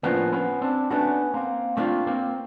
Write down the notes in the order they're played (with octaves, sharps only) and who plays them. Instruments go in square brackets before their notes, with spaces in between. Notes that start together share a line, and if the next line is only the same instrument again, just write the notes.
[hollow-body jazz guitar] A2 F3 A#3 D4 [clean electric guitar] B3 C#4
[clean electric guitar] B3 C#4
C4 D4
[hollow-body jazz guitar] A3 D4 F#4 A4 [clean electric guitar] B3 C#4
[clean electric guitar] A#3 C4
[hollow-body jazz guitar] A3 D4 F4 [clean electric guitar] A#3 C4
[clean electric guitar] A#3 C4